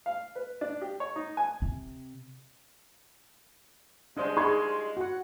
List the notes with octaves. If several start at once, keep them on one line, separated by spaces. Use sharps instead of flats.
F5
B4
D4
G4
C#5
D#4
G#5
C3
F3 G3 G#3 D4 C5
D#4 C6 C#6 G#6
F#4 F#5